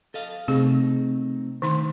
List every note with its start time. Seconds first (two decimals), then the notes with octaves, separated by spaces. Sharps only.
0.14 A4 D#5 F5
0.48 C3 A3 C4 D#4 G#4
1.62 D2 D#3 D#4 C6